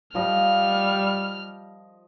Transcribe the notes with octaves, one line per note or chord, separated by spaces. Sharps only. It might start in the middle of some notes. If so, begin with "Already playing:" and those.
F3 G3 D#5 F6